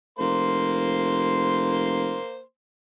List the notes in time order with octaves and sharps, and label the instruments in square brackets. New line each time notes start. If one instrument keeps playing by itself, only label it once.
[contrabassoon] F1 [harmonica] A#3 C5 C6